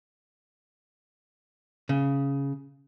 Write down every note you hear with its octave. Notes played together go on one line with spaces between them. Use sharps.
C#3